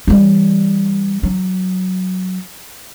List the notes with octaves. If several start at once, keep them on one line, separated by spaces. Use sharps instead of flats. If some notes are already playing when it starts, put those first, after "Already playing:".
E3 G3
F#3